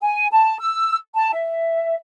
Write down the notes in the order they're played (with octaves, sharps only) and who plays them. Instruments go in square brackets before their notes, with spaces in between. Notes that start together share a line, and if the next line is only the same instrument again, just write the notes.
[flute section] G#5
A5
E6
A5
E5